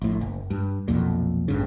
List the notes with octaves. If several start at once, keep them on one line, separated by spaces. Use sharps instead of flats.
A#1 A2
F#1
G2
B1 F2 A#2
A1 G2 C#3